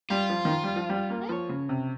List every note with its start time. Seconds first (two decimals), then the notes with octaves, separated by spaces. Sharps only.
0.10 G3 F4
0.30 F3
0.45 D#3
0.51 F3
0.63 G3
0.76 F3
0.89 G3
1.10 A#3
1.29 F3 C#5
1.49 C#3
1.69 C3